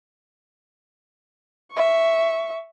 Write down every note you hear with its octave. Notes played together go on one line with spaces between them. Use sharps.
E5 C#6